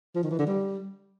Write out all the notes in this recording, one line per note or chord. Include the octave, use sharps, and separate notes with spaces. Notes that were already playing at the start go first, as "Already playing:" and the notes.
F3
D#3
E3
D3
G3